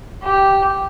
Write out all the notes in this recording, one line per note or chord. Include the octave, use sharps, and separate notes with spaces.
G4